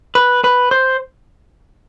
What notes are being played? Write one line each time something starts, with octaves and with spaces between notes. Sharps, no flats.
B4
B4
C5